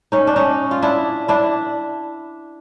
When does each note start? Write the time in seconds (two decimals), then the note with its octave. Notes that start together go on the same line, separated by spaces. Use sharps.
0.12 C#4 D#4
0.27 D4
0.36 C#4 D#4
0.71 F4
0.82 D4 E4
1.28 D4 E4